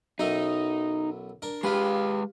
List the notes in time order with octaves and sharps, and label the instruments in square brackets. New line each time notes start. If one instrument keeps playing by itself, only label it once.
[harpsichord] B1 F#2 E4 [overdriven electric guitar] D#4
[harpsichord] D4 A#4
[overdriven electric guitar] G#3 B4 [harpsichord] F4 G4